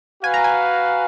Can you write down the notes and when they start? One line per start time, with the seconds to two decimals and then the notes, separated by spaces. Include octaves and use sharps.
0.23 F#4 B4 F5 G#5
0.34 A#5
0.44 G#5